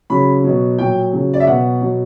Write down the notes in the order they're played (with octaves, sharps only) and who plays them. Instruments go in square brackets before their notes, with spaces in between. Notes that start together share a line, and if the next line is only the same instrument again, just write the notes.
[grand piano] C#3 F#3 B5
B2 F#3
A#2 F#3 G5
C#3 F#3
D5
E5
B2 F#3 F#5
B2 F#3